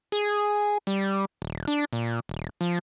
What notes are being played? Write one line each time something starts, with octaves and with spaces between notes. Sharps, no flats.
G#4
G3
D#1
D4
A#2
D#1
F3